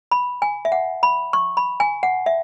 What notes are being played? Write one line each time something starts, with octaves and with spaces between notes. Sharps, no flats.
B5
G#5
E5
F#5
B5
C#6
B5
G#5
F#5
E5